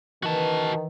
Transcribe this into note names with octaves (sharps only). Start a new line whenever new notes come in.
D#3 E3 F#4 A5